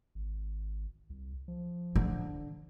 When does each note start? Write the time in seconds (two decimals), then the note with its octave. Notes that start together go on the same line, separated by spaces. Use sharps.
0.15 G#1
1.10 C2
1.48 F3
1.95 D3